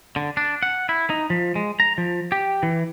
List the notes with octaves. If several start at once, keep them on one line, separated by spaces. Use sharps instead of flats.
D3
D4
F#5
E4
D#4
F3
G#3
A#5
F3
G4
E3